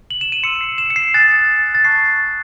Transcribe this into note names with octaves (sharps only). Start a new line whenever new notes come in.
F#7
E7
D#7
C6 E6 C#7
C7
E7
C#7
C7
G#5 D#6 F#6 A6
A6
A5 C#6 F#6 C7